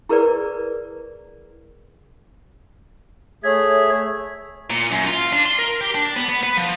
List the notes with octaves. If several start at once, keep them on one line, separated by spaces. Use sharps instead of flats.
E4 G#4 A#4 B4 D5
A3 G#4 C#5 E5
A#2
F#2
F4
D4
C6
A#4
G4
D4
B3
B3
B4
F3